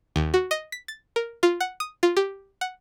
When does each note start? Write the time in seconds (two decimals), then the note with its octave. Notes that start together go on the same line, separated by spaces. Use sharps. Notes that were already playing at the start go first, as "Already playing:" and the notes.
0.16 D#2
0.34 F#4
0.51 D#5
0.72 B6
0.88 A6
1.16 A#4
1.43 F4
1.60 F#5
1.80 D#6
2.03 F4
2.17 G4
2.61 F#5